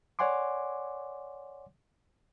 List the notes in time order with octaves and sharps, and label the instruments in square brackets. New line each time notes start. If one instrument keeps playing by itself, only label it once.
[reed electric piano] C#5 D5 F#5 G#5 C6 D6